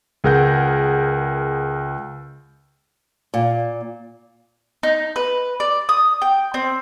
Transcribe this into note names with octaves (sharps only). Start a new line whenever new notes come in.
C#2 G#4 A#4 F#5 G6
A#2
D#4
B4
D5
D#6
G5
C4